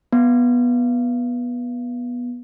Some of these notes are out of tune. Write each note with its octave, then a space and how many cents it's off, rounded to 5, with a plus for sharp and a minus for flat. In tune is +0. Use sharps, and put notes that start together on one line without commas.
B3 -15